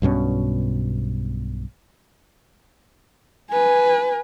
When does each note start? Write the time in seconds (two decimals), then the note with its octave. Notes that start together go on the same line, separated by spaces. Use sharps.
0.02 B1 G2 B2 C#4
3.51 B4 G#5